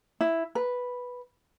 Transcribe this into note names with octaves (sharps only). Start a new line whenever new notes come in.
E4
B4